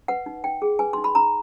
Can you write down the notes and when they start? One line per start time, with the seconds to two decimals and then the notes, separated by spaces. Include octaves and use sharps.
0.08 B4 F#5
0.26 D#4
0.44 D#4 G5
0.62 G#4
0.79 B4 G#5
0.93 D#4 C6
1.04 B5
1.15 D#4 A#5